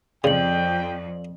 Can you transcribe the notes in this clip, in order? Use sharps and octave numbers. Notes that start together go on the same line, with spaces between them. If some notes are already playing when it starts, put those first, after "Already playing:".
F2 C#3 D5 G5 F#7